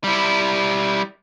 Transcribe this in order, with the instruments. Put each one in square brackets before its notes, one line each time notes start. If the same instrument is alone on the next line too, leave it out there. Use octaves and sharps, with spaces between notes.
[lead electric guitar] G3 E4